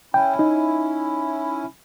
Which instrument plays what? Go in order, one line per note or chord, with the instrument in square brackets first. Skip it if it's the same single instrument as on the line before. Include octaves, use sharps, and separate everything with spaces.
[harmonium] C#4 E4 [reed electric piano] G5
[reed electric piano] D#4